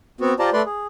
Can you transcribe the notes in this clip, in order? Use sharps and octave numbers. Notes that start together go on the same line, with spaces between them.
B3 C4 F#4
F4 G4 C5 D5 A5 A#5
A3 B4 D5 C6
G#4